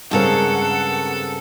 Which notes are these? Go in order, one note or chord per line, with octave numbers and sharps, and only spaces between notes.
G2 C#3 G#3 C4 C#4 A4 A#4 F#5